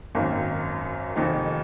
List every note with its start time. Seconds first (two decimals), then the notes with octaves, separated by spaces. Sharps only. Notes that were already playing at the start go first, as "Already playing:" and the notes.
0.15 G#1 F#2 D#3 F#3 A#3
1.16 F1 F2 D#3